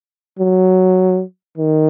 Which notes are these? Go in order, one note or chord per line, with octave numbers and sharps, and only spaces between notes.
F#3
D#3